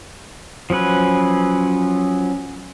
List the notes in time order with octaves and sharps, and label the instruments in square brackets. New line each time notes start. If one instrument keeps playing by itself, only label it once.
[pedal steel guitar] F3 F#3 C#4 B4